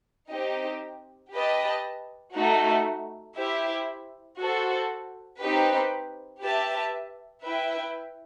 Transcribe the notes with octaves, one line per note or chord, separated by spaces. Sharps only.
C4 D#4 G4 D#5
G4 B4 D#5 A5
A3 D#4 F#4
E4 G4 C5 E5
F#4 A4 C5
C4 D#4 G4 B4
G4 B4 E5 A5
E4 B4 E5 G5